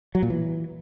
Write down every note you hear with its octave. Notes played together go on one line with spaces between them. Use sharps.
F#3
A#2
E3